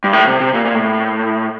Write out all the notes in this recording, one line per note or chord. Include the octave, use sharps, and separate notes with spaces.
G2
A2
C3
C3
A#2
A#2
A2